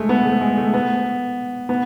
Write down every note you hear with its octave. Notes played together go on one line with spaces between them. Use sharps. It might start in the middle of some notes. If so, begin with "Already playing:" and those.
Already playing: G#3 A3
B3
A3
G#3
A3
B3
B3